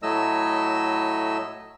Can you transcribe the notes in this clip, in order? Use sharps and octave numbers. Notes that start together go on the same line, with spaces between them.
A2 F#3 A3 D#5 E6